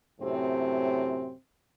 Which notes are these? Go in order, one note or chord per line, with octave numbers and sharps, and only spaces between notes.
F#2 A2 C3 C4